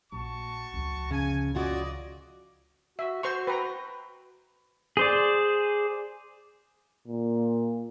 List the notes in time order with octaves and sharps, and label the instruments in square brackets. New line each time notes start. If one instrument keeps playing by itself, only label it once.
[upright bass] A#1 [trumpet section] F#4 A5 C#6
[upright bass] C#2 F3
[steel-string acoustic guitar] C#3 [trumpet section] G#5
[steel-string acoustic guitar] C#3 F4 F#4 [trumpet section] D5 D#5
[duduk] F#4 [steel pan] E5
[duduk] F#4 [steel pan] C5 C6 C#6
[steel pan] B4 G5 A#5
[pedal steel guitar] G#4 C5 D5
[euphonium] A#2